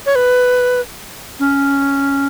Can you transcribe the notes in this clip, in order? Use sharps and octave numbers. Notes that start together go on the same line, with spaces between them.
C#5
B4
C#4